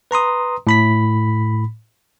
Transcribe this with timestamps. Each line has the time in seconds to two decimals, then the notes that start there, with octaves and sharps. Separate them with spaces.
0.11 B4 A#5 C6 D#6
0.67 A2 B5 B6